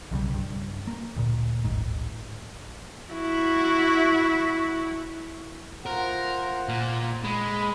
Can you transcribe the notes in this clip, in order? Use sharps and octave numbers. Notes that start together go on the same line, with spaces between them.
B1 C#3 F3 G3
G2
A#3
D2 A#2
D1 G#1 G#2
E4 F#4
F4 A#4 C5 F#5
A#2
G#3 B5